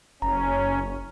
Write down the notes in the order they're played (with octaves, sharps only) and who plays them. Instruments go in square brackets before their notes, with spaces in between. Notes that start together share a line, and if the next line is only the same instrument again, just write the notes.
[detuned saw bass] F#1 [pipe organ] C#4 [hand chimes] A#5